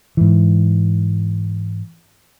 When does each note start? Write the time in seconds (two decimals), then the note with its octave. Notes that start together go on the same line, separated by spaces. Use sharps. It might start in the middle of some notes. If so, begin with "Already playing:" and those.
0.17 G#2 E3